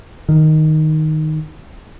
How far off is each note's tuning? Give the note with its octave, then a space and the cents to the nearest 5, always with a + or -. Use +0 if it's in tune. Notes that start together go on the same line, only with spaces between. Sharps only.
D#3 +0